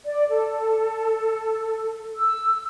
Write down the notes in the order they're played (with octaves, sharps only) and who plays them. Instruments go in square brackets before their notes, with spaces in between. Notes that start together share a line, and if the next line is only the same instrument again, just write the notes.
[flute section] D5
A4
E6